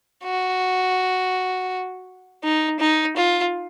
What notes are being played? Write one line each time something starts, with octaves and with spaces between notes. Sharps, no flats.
F#4
D#4
D#4
F4